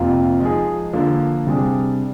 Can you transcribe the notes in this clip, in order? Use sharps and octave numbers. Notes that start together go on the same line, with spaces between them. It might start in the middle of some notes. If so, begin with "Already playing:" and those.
Already playing: F2 C3 F3 A#3 F4
F3 G#3 D#4 G#4
D3 F3 A#3
C3 G3 D4 G#4